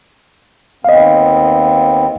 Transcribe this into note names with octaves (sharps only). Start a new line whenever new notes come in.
D#2 B3 C4 D#5 F5